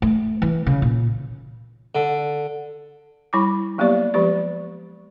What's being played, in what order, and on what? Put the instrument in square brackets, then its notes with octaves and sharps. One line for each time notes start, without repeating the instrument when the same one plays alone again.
[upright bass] A3
E3
C#3
A#2
[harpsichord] D3
[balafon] G3 E4 B5 D6
F#3 A#3 B3 G4 D5
F3 G#3 G4 D5